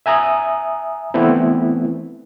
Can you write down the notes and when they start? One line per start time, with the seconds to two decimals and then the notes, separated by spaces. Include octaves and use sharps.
0.06 E5 G#5 A#5 D#6
1.14 E3 A3 B3 C4 E4